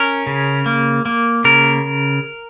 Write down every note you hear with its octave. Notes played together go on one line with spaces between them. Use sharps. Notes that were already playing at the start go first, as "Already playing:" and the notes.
Already playing: C#4 A#4
C#3
A#3
A#3
C#3 A#4